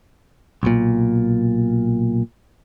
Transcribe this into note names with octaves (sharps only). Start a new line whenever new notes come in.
B1 A#2